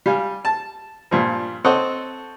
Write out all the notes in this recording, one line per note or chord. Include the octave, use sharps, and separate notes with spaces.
G3 F5 G#5
A5
G2 A#2 F3
C4 A4 C#5 D#5 F#5